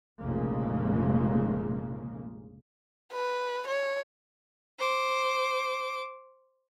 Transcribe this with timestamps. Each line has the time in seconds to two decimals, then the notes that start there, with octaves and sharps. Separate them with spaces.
0.20 F1 A#1 C#3 G#3 A#3
3.13 B4
3.68 C#5
4.79 C5 D6